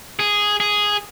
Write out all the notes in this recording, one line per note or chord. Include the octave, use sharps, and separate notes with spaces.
G#4
G#4